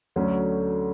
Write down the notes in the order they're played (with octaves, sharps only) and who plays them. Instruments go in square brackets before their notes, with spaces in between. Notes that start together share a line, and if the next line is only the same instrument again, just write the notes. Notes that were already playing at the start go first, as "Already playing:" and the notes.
[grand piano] D2 D3 F#3 A3 C#4